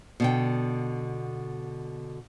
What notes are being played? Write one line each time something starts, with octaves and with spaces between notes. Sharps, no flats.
B2 D3 G5